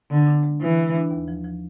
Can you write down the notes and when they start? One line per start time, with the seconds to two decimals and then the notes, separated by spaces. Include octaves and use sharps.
0.10 D3 B3
0.27 D4
0.43 G#3
0.61 E3 B3
0.77 G#3
0.94 D4
1.10 D#2
1.28 F3
1.44 F3